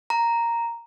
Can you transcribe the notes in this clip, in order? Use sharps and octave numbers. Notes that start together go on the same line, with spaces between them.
A#5